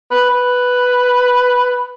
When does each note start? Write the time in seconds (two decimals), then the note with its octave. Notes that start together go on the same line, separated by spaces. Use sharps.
0.11 B4
0.31 B4